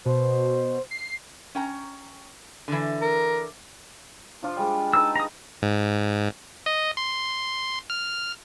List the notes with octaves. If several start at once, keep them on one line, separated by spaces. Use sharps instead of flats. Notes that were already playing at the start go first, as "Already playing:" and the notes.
B2 C5
C7
C#4 G5 A#5
D3 E3
A#4
F3 D4 F4
G3 G#3
D#4 B4 A5 E6
A#5 D#6
G#2
D#5
C6
F6